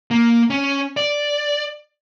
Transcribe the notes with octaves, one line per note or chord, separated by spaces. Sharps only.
A#3
C#4
D5